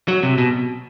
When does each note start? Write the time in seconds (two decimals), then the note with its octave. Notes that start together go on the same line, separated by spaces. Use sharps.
0.08 F#3
0.23 C3
0.38 B2